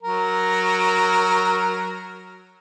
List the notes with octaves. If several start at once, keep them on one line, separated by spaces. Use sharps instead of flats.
F#3 A#4